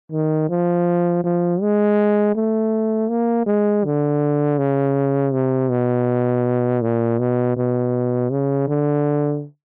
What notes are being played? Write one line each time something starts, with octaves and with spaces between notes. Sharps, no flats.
D#3
F3
F3
G#3
A3
A#3
G#3
D3
C#3
C3
B2
A#2
B2
B2
C#3
D3